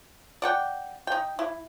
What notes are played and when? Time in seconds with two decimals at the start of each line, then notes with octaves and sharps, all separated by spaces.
0.42 D5 F#5 G5
1.07 D#4 G5
1.39 E4